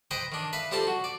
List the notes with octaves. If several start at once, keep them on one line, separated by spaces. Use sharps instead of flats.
B4 C5 D#5 G5 A#5
D#3 D4
B4 E5 F5 B5
G3 C4 F4 A4 A5 C6
F#4
D5